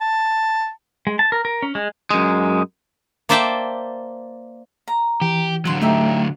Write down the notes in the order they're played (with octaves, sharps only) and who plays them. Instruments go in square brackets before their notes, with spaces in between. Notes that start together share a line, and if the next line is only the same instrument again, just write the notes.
[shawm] A5
[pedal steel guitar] G#3
A5
A#4
A#4
C#4
G#3
[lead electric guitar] F#2 G#3
[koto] A#3 C5 D5 E5 G5 A5
[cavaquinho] A#5
[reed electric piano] E3 [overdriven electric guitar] G4
[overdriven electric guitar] D3 F#3 [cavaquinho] F#5 C6
[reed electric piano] A3 [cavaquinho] D#4 G4 E5